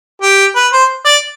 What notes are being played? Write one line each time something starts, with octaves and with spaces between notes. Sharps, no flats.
G4
B4
C5
D5